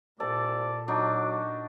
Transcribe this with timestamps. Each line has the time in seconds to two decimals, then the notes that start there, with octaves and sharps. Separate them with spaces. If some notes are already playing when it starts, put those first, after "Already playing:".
0.20 C2 A#2 A4 D5 D6
0.88 F#3 D4 D#4 F#4 D6